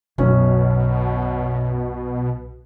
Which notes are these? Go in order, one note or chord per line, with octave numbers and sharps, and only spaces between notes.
B1 F#2 B2 C#4